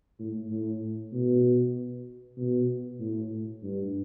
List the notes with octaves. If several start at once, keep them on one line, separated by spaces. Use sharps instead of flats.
A2
A2
B2
B2
A2
G2